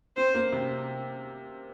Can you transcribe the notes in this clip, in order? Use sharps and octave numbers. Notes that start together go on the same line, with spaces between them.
C4 C5
A#3
C3